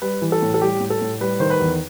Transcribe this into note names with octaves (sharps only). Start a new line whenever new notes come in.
G3 B4
E3
A4
A2
A4
G3 G4
A2
A4
A2
G3 B4
D#3 C5
B4
E2